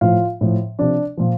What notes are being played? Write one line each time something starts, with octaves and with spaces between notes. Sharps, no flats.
A2 F3 F4 F5
A2 F3
C3 F3 D4 D5
A#2 F3